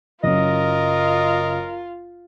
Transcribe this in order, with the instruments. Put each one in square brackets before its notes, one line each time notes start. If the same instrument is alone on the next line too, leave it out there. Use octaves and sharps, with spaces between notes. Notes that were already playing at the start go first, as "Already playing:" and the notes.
[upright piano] F#1 F#2 [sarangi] F4 [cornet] A#4 [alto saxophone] D#5